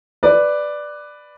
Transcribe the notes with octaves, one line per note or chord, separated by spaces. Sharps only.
B4 D5